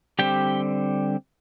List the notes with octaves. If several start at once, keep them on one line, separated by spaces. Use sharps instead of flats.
D3 G3 C4 G4 G5